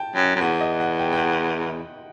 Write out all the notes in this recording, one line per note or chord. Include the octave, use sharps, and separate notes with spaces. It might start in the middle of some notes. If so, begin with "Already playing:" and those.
Already playing: G5 A5
F#2 G5
F#2
E2 F#5
D#5
F#5
G5
G5
F#5